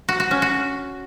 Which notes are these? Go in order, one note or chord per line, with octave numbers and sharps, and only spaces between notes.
F#4
F#4
C#4
F#4